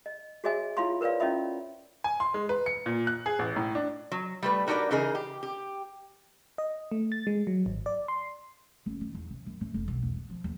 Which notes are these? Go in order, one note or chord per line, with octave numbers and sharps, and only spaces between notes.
D#5
F#4 G#4 C#5 D#5 E5 G#5
E4 F4 C#5 F5 B5 C6
A#4 B4 C#5 D5 F5
C#4 E4 F4 D#5 E5 B5
G#5
C6
G#3
B4
C#7
A#2
F#6
G#4
A1
A2
D4
F#3
G3 A3 B4
D4 D#4 F#4 G4 A#4 D5
C#3 E3 D#4 G#4 A#4
G4
G4
D#5
A3
A6
G#3
F#3
G#1
D5
C6
F#1
D#3
E2
C3
F#2
A2
F1
B1
E2
B3
F3
D#2